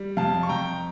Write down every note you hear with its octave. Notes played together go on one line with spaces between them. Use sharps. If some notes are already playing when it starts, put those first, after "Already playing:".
Already playing: G3
F2 F5 A5
C#6
F2 G5 A#5